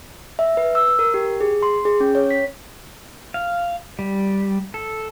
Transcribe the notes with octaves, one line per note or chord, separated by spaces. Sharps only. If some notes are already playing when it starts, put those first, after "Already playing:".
E5
B4
E6
A#4
G4
G#4
C6
G#4
C#4
C#5
B6
F5
G3
A4